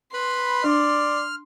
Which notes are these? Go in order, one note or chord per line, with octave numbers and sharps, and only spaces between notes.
B4 B5 C6
D4 D5 F6